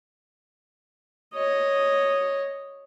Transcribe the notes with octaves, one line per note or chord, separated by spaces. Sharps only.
C#5 D#5